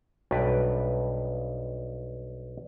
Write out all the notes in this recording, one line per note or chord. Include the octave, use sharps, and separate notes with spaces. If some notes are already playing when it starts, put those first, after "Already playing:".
B1 G2 B4 D5